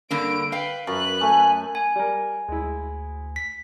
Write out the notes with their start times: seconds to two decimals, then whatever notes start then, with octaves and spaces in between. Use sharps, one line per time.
0.11 G2 D3 A#3 D7
0.52 B4 F5 G5
0.87 F#2 B4 F#6
1.21 A3 G#5
1.75 G#5
1.96 G3 A#4
2.48 D2 G#3 E4
3.36 B6